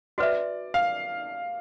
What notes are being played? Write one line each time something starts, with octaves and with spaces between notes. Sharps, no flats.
F#4 B4 D5 E5
F5